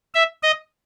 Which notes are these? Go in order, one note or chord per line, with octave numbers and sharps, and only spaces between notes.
E5
D#5